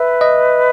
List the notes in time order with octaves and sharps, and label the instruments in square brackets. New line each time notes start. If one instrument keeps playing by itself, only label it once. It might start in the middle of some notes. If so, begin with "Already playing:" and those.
Already playing: [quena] B4 [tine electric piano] E5
[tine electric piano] D#5